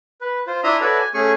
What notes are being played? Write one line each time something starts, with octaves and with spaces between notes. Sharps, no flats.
B4
F4 C5
D4 E4 E5 A#5 C6 D#6
F#4 A4 B4 C#5 D5 E5
G#5
A3 C#4 G#4 G#5 C#6